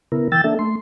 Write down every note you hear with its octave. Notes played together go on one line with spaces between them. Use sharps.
C#3 B3 E4 A#4
E3 G5 E6 A6
A#3 D4 A4 E5
A3 C6